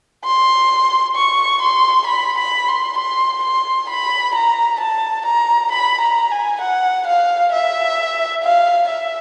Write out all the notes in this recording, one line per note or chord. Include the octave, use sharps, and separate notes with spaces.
C6
C#6
C6
B5
B5
C6
C6
C6
B5
A#5
A5
A#5
B5
A#5
G#5
F#5
F5
E5
F5
E5